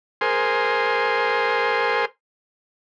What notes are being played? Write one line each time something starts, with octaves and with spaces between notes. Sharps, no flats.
G#4 A#4 C5 G#5 C6